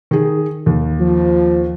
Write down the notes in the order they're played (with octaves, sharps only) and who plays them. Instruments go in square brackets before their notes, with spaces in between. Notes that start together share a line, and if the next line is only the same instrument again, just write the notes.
[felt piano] D#3 G#4
D#2
[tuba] F3